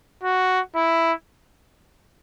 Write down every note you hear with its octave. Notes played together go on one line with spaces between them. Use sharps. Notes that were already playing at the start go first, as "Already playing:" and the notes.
F#4
E4